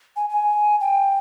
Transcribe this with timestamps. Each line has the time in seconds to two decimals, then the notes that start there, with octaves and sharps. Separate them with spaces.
0.16 G#5
0.30 G#5
0.81 G5